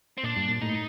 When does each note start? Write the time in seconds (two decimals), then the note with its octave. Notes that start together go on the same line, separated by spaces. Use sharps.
0.18 C4
0.23 A#2 D4
0.36 G2
0.49 A#2
0.61 A2 D#4